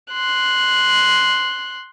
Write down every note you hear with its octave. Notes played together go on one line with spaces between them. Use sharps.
C6 F#6